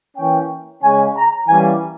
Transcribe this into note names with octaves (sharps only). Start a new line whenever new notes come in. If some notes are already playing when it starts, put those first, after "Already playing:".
E3 A#3 C#4 G5
C#3 G#3 C#4 G#5
A#5
E3 G3 A#3 C#4 G#5